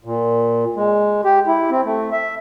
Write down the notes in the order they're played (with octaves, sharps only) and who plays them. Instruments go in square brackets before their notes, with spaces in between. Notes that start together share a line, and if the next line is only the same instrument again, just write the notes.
[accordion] A#2
G#3
G4
E4
C4
A3
E5